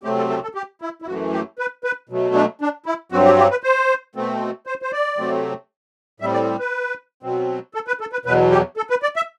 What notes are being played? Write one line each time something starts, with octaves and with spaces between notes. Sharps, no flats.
C3 F#3 A3 C4 G4
A4
A4
A4
G4
E4
E4
F#2 E3 A3 F#4
G4
B4
B4
B2 F#3 A3
D4
D4
E4
G2 F#3 C4 F#4
G4
G4
B4
C5
B2 A3 C4
C5
C5
D5
C3 F#3 A3 C4
A2 G3 C4 E5
D5
B4
B2 F#3 C4
A4
B4
A4
B4
E2 B2 F#3 B4
G4
A4
B4
D5
E5